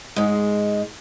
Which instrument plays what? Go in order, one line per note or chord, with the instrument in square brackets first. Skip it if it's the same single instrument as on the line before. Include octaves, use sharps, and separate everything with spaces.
[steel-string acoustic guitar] G#2 G#3